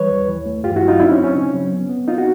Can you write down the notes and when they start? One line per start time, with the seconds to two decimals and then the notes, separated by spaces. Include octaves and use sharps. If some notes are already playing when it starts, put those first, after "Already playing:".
Already playing: E3 G3 B4 C#5
0.10 D#2
0.28 E3
0.46 A3
0.64 G2 F4 G4
0.76 E4 F#4
0.82 F#3
0.88 D#4 F4
1.00 C4 D4 E4
1.12 C#4 D#4
1.17 C4
1.24 C#4
1.35 C#3
1.54 F#3
1.72 B3
1.89 B3
2.08 C4 D#4 F4
2.18 F#4